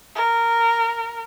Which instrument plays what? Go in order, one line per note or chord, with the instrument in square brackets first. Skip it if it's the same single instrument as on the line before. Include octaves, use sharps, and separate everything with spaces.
[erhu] A#4